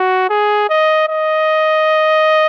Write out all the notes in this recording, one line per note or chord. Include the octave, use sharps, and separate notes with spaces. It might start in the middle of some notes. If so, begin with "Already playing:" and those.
Already playing: F#4
G#4
D#5
D#5